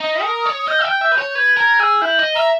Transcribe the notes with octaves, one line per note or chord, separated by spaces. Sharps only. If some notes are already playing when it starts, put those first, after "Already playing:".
D#4 D#6
A#4
C#5
D#5 G6
E5 E6
G5 G6
E5
B4
C#5
B4 G#6
A#4 G#6
G#4 E6
E4 G6
D#5
E5 A#5